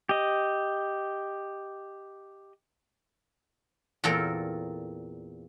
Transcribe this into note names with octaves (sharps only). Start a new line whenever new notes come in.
G4 D#5
E2 A#2 C4 A4 A#4